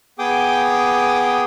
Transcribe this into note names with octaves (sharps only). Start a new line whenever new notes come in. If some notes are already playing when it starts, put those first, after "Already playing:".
B3 G#4 G5 D6 D#6